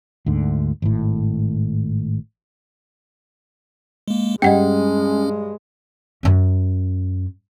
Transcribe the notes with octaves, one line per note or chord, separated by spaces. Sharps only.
D2 G#2 D3
G#1 A2
G#3 A#3
G2 G#3 C#4 D#5 F#5 G5
F#2 C#4